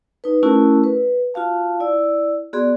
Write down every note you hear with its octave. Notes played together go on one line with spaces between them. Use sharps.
D#4 B4
A3 C#4 E4 F#4 A#4
B4
F4 F#4 F5 A5
E4 D5 E6
B3 F#4 G#4 D5 C6